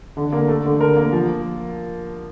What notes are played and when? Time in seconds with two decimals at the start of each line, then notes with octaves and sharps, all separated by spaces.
0.17 D3
0.32 A#3
0.48 A3
0.65 D3
0.81 A#4
0.97 A#3
1.13 F3